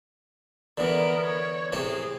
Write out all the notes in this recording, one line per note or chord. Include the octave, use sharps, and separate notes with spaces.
D3 E3 B3 A#4
C#5
A2 C3 C4 G#4